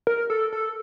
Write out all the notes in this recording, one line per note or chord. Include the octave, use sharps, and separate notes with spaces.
A#4
A4
A4